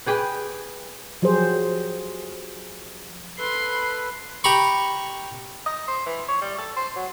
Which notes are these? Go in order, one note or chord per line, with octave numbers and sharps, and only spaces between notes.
G4 G#4 B4
F3 F#3 G4 G#4 C5
A4 B4 B5 C6
G4 A#5 B5 C#6
D#5
C5
E3
C#5
G3
A4
C5
F#3